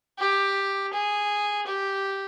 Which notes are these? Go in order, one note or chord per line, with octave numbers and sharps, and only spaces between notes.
G4
G#4
G4